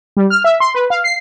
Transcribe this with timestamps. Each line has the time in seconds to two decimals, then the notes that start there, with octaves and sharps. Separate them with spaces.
0.17 G3
0.30 F6
0.44 E5
0.60 C6
0.74 B4
0.90 F5
1.04 C7